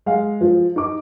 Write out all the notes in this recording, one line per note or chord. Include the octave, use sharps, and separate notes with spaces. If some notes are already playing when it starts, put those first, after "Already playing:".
G#3 F5
F3
D#4 D6